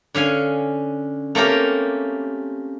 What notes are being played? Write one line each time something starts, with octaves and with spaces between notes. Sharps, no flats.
D3 C#4 F5 G#5
A3 A#3 C4 C#4 G4 A#4